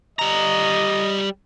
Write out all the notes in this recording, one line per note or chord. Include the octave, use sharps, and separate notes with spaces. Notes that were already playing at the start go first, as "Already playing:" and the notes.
G3 D#5 A#5